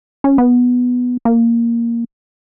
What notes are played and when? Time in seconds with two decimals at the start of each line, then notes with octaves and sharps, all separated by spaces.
0.24 C#4
0.38 B3
1.25 A#3